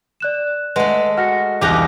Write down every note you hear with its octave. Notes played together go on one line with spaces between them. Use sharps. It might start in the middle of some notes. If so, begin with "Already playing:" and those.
D5 F#6 E7
G#3 A3 B4 D#5 F#5
F#4 F6 A#6 C#7
E1 C2 D#4 G4 A#5 D6 F#6